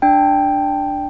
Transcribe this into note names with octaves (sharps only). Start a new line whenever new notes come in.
D4 G5